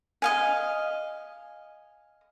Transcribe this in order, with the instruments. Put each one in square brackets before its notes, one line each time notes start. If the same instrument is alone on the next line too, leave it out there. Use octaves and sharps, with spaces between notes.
[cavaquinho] D#5 F5 G#5